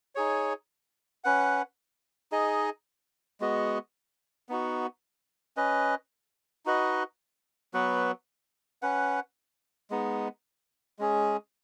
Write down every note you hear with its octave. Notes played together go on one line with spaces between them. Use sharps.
D#4 G#4 C#5
C#4 B4 F#5
D#4 G#4 D#5
G#3 B3 F#4 D#5
B3 D#4 F#4
C#4 B4 D#5
D#4 F#4 B4 D#5
F#3 B3 F#4 B4
C#4 B4 F#5
G#3 B3 D#4
G#3 C#4 G#4